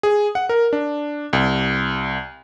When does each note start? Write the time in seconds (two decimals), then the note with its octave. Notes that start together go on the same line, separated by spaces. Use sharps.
0.03 G#4
0.35 F#5
0.49 A#4
0.73 D4
1.33 C2